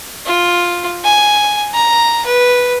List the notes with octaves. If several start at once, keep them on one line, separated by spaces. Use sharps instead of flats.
F4
G#5
A#5
B4